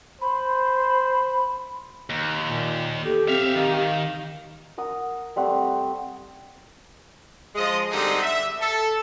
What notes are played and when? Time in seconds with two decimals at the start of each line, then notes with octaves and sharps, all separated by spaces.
0.21 C5 B5
2.10 D#2
2.44 A#2
3.04 G4 A4
3.28 C4 E5 F5
3.55 D#3 F5
4.78 A#4 F#5 D#6
5.36 G3 A3 C4 F#5
7.55 F3 G#3 D#5
7.91 D3 G3 G#3 C4 D#4
8.22 E5
8.59 A4